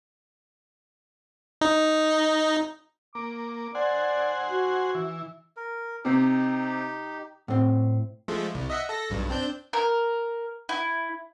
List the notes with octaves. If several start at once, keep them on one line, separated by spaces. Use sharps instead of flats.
D#4
A#3 D6
C5 D5 F#5 G#5
F#4
E3
A#4
C3 C4 D#4 G4
A2 C4
F3 G#3 A3
C2
D#5 E5 F#5
A4 A#6
B1 G2
C4 D4 G6
A#4
E4